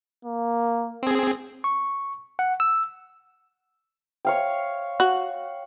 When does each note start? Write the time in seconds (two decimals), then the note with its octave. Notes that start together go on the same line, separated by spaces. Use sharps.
0.25 A#3
1.03 C4 G#4
1.64 C#6
2.39 F#5
2.60 E6
4.25 C#5 F5 G5
5.00 F#4